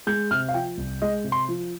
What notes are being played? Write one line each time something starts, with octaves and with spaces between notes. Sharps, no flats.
G#3 G6
C3 F6
F5
F3 G5
C2
G#3 D#5
C3
C6
F3